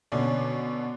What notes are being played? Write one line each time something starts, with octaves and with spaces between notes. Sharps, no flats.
B2 D3 C#4 D5